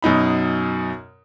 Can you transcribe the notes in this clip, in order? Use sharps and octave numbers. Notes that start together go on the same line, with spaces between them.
F#2 B2 D#4 B5